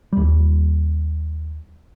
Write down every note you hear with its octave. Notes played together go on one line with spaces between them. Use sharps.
D#2 G3